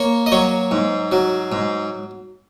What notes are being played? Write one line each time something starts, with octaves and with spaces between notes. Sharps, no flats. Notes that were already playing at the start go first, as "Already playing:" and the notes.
Already playing: A#3 C#5
D#5
F#3 C#5
G#2
F#3
G#2